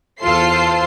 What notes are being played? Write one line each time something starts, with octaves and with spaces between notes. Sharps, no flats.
E2 F4 A4 C5 C6 C7